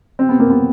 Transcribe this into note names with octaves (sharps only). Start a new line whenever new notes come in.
C4
B3
A#3
B3